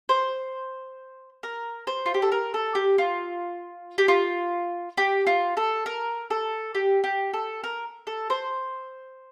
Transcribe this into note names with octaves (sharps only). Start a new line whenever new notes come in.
C5
A#4
C5
F4
G4
A4
A#4
A4
G4
F4
G4
F4
G4
F4
A4
A#4
A4
G4
G4
A4
A#4
A4
C5